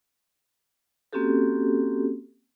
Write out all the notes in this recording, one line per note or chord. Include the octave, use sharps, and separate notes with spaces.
A#3 C4 C#4 F#4 G4 A4